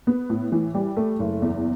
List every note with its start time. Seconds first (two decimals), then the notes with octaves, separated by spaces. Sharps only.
0.07 B3
0.30 A2
0.52 E3
0.75 G3
0.97 A3
1.19 F#1
1.42 E2